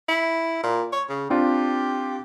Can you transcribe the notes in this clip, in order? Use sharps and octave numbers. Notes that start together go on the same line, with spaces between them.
E4
A#2
C#5
C#3
C4 D4 F4 G4